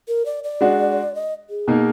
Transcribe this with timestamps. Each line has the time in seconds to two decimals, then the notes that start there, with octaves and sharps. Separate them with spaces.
0.08 A#4
0.26 D5
0.44 D5
0.61 G#3 D4 F#4
1.15 D#5
1.50 G#4
1.68 B2 A#3 D#4 A#4